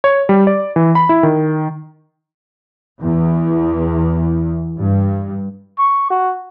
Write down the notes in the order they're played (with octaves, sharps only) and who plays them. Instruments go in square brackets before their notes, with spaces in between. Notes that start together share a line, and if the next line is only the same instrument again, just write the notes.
[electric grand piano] C#5
G3
D5
E3
B5
E4
D#3
[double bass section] E2
G2
[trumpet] C#6
F#4